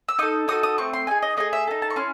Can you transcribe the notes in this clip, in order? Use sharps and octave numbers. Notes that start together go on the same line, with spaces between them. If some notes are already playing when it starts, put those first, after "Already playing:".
E6
D#4 A4 D#6
D#4 F#4 A4 D#6
D#6
A3 C4 C#6
C6
D#4 G#4 G#5
D#5
A3 D#4 G#4 D#5
E5
D#4 A4
A5
C#6
C#4 E4 C6